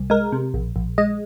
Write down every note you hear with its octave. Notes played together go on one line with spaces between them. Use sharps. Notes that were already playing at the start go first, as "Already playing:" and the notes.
Already playing: C2
G#3 A#4
C3
A#1
A#1
G#3 D#5